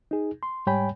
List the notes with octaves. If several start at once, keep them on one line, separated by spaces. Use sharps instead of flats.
D#4 G#4
C6
G#2 G3 C#5 G5 G#5 B5